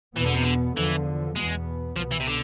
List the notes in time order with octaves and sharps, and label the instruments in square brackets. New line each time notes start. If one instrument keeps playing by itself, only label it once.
[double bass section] E2 B2 B3 [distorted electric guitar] E3
[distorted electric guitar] D3
C3
D3
[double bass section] E2 D3 F3 [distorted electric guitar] E3
[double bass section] E2 B2 B3 [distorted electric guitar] G#3
[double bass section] C2 B2 B3 [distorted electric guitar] F3
[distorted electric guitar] E3
C3
D3